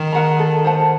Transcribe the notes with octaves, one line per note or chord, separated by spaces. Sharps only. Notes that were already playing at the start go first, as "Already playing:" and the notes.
Already playing: D#3
A#4 F#5 A#5
A4
C5 F#5 A5